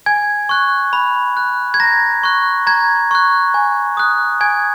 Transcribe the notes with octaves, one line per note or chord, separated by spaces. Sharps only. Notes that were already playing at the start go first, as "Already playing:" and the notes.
G#5 G#6
C#6 F#6
B5
F#6
G#6
A#5 A#6
C#6 F#6
A#5 G#6
C#6 F#6
G#5
D#6 F#6
G#5 G#6